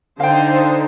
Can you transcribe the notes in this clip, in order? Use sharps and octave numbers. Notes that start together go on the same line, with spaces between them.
D3 D#4 C5 F5 G5